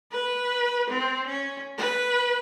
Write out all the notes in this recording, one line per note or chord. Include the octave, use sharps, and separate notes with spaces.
B4
C4
C#4
B4